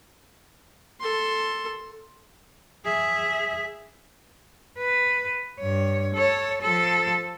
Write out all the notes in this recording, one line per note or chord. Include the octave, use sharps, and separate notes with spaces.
A4 C6
G#4 E5
B4
G2 C#5
A4 C#5
F3 A4